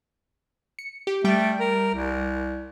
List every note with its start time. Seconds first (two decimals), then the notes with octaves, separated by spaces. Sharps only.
0.79 C#7
1.07 G4
1.24 G3 A3 G5 D7
1.60 A#4
1.95 C2